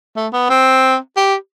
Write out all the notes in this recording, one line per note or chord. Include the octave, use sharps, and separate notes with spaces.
A3
B3
C4
G4